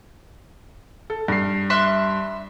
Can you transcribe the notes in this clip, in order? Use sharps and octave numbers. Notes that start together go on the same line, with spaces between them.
A4
G2 C7
E5 C6 F#6